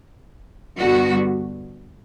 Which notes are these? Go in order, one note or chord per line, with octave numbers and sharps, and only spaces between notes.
G2 D3 G3 B3 F#4